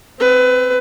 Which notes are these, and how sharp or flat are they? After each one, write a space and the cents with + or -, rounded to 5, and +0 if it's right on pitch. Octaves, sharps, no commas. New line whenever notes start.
C4 +0 B4 +25